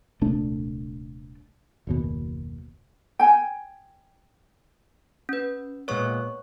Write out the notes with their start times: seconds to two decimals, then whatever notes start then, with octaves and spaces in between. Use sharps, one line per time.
0.21 D#1 C2 A3 D4
1.87 F#1 D#2 B2
3.19 G5 G#5
5.29 C#4 B4
5.88 A#2 G#3 B3 C#5 C#6